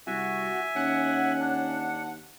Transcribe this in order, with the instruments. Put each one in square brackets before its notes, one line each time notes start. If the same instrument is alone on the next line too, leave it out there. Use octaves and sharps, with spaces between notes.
[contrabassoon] C2 [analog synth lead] F#4 [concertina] E5 G#5
[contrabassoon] D#2 [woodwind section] C#4 [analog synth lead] F#5
[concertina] D4